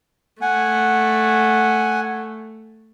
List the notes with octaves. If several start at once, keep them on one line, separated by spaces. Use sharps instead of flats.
A3 F#5 G#5